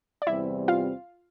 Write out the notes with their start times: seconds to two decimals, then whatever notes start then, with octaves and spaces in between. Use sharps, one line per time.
0.22 D5
0.27 E2 C3 G3 C4 E4 E5
0.68 F4 F5